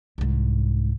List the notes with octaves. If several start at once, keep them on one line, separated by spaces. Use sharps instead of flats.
C2 G#2